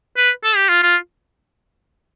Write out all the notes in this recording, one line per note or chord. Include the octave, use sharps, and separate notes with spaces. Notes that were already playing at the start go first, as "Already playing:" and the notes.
B4
A4
G4
F4
F4